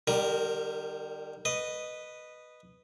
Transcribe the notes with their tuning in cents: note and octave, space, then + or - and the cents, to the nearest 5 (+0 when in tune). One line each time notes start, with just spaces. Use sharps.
D#3 -45 G3 +0 A#4 +0
B4 +0 D#5 -10